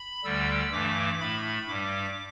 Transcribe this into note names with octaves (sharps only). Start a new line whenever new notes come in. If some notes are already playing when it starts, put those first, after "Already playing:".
Already playing: B5
D2 D3 G3 E6
G2 E3 A3 D6
A2 A3 B5
G2 G3 D6